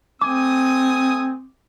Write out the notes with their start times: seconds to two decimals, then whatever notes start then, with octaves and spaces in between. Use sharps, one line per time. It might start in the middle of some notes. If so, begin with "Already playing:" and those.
0.21 A3 C4 G#5 D6 D#6